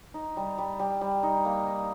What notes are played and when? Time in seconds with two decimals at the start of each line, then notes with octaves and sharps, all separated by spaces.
0.14 D#4
0.37 G3
0.58 G3
0.79 G3
1.01 G3
1.23 D#4
1.45 A#3
1.66 D#4